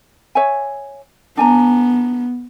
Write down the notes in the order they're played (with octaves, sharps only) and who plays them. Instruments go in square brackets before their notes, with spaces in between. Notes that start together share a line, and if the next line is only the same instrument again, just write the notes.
[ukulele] C#5 E5 G#5
[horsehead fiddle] B3 [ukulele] D4 G#5 A#5